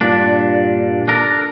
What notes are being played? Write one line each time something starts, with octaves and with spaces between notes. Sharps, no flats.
G2 A#2 D4
D4 A4 A#4